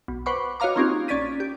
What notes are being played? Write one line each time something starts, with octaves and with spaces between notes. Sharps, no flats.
B1
B4 C5 F#5 B5 C#6 D6
F#4 C#5 D#5 F5 A#5 D6
A#3 C4 C#4 D#4 F4 G4
A#1 C#4 D5 A6 B6 D#7
G4